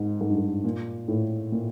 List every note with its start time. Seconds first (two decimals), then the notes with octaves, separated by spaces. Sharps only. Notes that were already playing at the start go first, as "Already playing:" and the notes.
Already playing: G#2
0.21 G#2
0.30 G2
0.38 G#2
0.64 A#2
1.08 A2
1.52 A#2